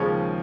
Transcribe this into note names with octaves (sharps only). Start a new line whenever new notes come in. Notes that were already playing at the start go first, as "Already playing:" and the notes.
Already playing: D#2 C#3 F3 G#3 C#4